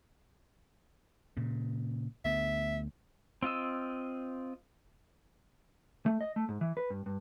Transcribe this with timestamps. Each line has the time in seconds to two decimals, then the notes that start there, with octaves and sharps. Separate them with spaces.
1.37 A#2 C#3
2.25 D2 A3 B3 E5
3.43 C4 F4 D#5 E6
6.06 A3
6.21 D#5
6.36 A3
6.49 G#2
6.61 E3
6.77 B4
6.90 G2
7.06 G2